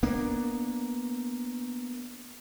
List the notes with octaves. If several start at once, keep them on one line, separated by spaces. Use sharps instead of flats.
A#3 B3 D4